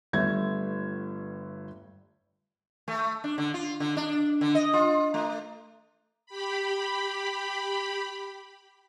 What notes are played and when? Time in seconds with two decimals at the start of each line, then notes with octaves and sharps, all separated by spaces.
0.13 G1 G2 A3 C#5 E5 G#6
2.88 A3
3.24 D4
3.38 D3
3.54 F4
3.80 D3
3.97 D4
4.41 D3
4.55 D#5
4.73 F4
5.14 A3
6.26 G4 B5